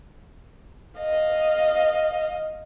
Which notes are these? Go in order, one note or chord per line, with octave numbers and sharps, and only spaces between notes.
D#5 F5